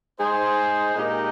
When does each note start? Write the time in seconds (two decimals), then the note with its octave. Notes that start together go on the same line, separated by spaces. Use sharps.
0.20 G#3 D#4 G#4 C5
0.95 A#2 G#3 D#4 G4 A#4